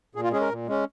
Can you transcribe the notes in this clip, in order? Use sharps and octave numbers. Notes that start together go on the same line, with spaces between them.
A#2 G#4
F4
G#3 C#4 G#4
A#4
A#2
G#3 C#4